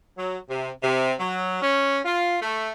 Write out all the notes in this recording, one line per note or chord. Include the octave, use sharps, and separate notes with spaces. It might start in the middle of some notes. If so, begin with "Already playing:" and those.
F#3
C3
C3
F#3
C#4
F4
A3